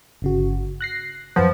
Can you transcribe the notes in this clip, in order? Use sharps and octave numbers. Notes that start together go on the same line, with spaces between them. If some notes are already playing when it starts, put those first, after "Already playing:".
G1 C#3 F#4
F#6 A#6 C7
F#2 F3 B4 F#5